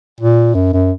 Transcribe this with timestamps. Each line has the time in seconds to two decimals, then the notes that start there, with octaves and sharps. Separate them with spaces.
0.20 A#2
0.55 F#2
0.73 F#2